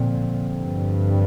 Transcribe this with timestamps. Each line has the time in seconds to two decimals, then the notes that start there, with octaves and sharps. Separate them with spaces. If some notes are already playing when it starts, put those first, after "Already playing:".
Already playing: A#2 D3 F3 C4
0.56 G2